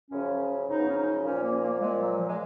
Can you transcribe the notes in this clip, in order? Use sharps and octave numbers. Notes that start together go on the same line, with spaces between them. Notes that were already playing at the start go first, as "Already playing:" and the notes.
F#2 C#3 F3 C#4
C#4
F#2 C#3 F3 D#4
B3
C#4
D#4
A#2 F3 C#4
A#3
A#3
A#3
A#2 F3 G#3
F#3
F3
G#3